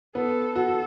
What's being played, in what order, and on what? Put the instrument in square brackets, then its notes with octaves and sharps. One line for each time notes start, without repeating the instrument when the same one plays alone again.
[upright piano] B3 [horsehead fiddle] A4
[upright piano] F#4 [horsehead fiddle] A4